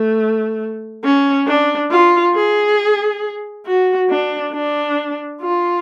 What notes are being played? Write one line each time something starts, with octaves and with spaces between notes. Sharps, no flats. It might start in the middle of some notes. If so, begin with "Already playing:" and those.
Already playing: A3
C#4
D4
F4
G#4
F#4
D4
D4
F4